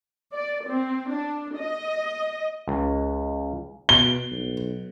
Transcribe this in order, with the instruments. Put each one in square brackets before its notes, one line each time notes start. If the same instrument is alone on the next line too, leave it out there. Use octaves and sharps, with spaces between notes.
[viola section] D5
C4
D4
D#5
[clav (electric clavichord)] C#2
[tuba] B2 [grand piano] G7
[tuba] B1